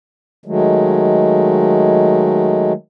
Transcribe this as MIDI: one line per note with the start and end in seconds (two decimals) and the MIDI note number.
0.46 2.73 51
0.46 2.73 54
0.46 2.73 56
0.46 2.73 57